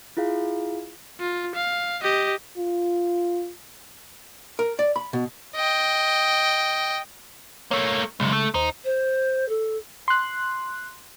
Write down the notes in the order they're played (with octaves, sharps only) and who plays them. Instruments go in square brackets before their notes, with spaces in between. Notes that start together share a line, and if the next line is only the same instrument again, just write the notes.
[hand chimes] E4 F4 G#4 F5
[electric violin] F4
F5
G4 D#5
[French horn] F4
[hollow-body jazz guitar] A#4
D5
B5
B2
[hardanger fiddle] D#5 G5
[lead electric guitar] A3 A#3 [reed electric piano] C#5
[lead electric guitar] B1 F#2 [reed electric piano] C#3 G#3
[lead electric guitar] A3
[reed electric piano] D#2 C5 [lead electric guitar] D#4
[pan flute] C5
A4
[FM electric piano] C6 F#6